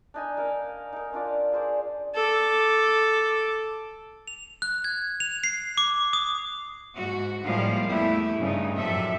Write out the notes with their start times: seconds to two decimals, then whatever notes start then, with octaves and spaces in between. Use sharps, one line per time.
0.14 D4 D#4 G#5
0.37 A#3 C#4 A#4
0.93 D#4 A#4
1.12 C#4 D4 F4 D5
1.52 G#4 A#4 C5 D5
2.15 A4 D6
4.28 F7
4.62 F#6
4.84 G#6
5.20 F7
5.44 C7
5.78 D6
6.13 D#6
6.94 G#2 F#4
7.44 A2 F3 G3 G#3 A#3 F5
7.87 E2 A3 E4 G4 B4
8.39 G2 C#3 D#4
8.76 F#2 A2 C3 F3 A4 E5